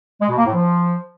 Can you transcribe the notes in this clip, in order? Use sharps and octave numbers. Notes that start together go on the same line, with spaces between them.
G#3
B2
A#3
A2
F3